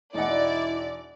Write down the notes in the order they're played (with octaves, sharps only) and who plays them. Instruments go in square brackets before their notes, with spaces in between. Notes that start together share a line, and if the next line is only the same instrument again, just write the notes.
[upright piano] E1 D#4 F#5 [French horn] E4 [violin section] D5